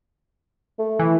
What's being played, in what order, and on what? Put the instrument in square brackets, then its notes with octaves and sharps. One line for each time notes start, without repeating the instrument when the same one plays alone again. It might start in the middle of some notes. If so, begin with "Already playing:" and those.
[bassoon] A3
[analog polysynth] E3